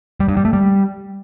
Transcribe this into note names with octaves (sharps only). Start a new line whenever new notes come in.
G3
G2
G3
A3
G3